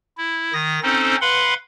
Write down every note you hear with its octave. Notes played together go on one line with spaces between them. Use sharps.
E4
D#3 D#6 A#6
C4 C#4 D#4 A4 C5
B4 F5 F#5 B5 C6